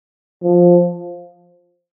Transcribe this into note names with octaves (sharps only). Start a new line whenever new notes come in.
F3